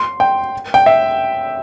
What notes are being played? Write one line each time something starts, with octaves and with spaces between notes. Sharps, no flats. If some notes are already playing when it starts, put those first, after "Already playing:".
Already playing: C6
G5
G5
E5